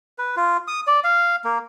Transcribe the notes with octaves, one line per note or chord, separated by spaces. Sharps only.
B4
F4
D#6
D5
F5
A#3